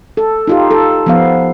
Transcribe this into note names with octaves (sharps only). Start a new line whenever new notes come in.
A4
D#4 F4 G4
A4
F3 B3 F5